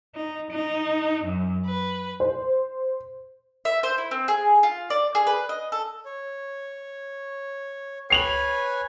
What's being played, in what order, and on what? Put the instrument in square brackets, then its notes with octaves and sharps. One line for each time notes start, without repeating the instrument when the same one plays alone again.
[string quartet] D#4
D#4
F#2
B4
[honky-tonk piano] C5
[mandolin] E5
C5
E4
C4
G#4
F4
D5
G#4
B4
D#5
A4
[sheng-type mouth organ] C#5
[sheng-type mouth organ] B4 C#5 G#5 [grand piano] C7 F7 F#7